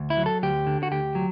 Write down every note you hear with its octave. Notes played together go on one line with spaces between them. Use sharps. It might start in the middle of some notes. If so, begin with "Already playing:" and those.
Already playing: D2
E4
F#3
A4
D2 G4
D3
F#4
D2 G4
F#3